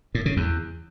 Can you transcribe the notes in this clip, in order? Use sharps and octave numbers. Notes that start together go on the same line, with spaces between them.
A2
C#3
E2